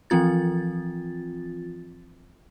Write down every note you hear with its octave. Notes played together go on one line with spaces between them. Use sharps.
E3 F3 C4 F4 A6